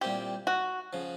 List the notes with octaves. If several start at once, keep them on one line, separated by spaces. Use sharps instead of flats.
A#2 G3 C4 E4 G4
F#4
C#3 F3